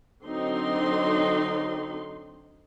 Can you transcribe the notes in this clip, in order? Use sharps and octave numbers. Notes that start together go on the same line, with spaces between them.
D3 F#3 C4 D#4 C6